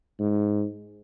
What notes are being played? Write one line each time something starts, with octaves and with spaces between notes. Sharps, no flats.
G#2